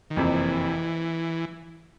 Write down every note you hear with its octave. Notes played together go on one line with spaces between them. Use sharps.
D#3
F#1 F2 C3 E3